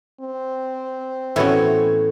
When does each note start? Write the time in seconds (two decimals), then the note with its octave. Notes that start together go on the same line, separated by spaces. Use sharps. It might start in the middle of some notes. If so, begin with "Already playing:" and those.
0.21 C4
1.36 A2 E3 B3 C#4 F#4 C#5 E5